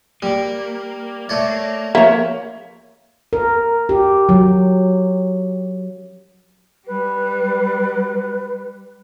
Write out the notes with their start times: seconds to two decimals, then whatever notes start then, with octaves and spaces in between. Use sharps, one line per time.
0.22 G3 A#3
1.29 A3 C#5 D5
1.95 F3 A#3 C#5 E5
3.33 A#4
3.89 G4
4.29 F#3
6.87 G3 B4